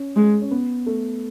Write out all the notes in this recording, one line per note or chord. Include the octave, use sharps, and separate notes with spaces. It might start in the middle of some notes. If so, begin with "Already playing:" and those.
Already playing: C#4
G#3
C#4
B3
A3